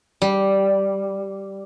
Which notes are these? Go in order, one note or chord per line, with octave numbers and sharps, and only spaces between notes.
G3